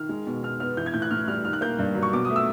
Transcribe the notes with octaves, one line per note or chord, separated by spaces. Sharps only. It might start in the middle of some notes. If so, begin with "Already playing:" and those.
Already playing: D#3 F6
G#3
B2
B2 F6
B3 F6
E3 G6
G#6
A2 G6
F#6
A2 F6
G3 F6
D#3 F6
F#6
A#3 G6
G2
F#3
C#6
B2 D6
A3 D#6
E6